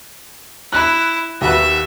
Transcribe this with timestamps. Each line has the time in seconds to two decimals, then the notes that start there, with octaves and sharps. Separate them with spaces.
0.73 E4 F#6
1.41 D#2 F#4 B4 E5